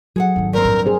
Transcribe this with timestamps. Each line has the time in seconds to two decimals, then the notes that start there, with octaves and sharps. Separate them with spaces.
0.16 F#3 G#4 A4 F#5
0.36 G#1 D#3
0.53 G2 C4 A#4
0.65 A2
0.86 G#4 C5